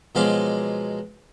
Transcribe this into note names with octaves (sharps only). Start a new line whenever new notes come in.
B2 F3 F#3 G#3 F5 D6